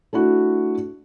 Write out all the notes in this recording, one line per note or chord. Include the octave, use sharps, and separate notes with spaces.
A3 D4 E4 F#4